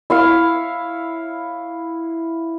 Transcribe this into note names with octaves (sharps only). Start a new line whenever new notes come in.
E4 C#5 F5